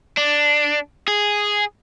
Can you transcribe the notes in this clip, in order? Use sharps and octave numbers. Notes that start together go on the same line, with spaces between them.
D4
G#4